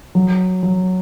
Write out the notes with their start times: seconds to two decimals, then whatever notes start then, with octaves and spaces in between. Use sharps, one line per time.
0.15 F#3
0.63 F#3